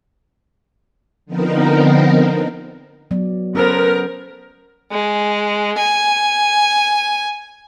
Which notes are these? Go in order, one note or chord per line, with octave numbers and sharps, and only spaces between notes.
D3 F3 B3 C4 D#4 A#4
F#3 B3 D5
B3 C#4 A4 A#4 C5
G#3
G#5